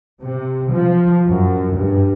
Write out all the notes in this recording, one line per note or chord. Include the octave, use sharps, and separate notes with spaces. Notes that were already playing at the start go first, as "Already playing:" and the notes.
C3
F3
F#2
G2